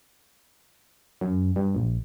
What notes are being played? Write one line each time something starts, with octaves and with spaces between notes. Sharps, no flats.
F#2
G2
A#1